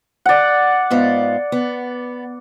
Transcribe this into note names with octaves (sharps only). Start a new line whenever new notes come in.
D5 F#5
G#2 B3 F4
B3